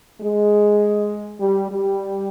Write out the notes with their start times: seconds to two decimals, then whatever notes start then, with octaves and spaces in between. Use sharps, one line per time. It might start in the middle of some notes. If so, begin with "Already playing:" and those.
0.20 G#3
1.40 G3
1.71 G3